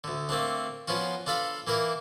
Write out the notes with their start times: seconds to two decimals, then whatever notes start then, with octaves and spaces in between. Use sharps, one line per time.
0.04 D2 D3
0.29 A3 A#3 C4 D4
0.88 F3 B3 C#4 F4 F#4
1.26 D4 F4 A4 F5 B5
1.67 E3 A#3 E4 A#4